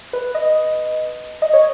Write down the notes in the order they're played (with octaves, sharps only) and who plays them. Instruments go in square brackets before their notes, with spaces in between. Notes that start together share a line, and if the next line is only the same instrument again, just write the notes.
[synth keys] B4
D#5
D#5
C#5